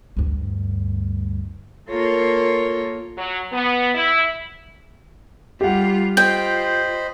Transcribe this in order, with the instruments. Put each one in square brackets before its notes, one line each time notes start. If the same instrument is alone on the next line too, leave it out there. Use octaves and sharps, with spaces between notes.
[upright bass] D2 G2
[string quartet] A#3 F4 A4 A#4 C#5
[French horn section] F#3
B3
E4
[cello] G3 F4 [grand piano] G4 F#5
[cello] F4 [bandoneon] C5 D#5 B5 [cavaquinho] G5